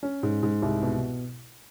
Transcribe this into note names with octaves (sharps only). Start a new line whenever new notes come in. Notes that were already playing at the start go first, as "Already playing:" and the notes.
C#4
G#2
G#2
C2
B2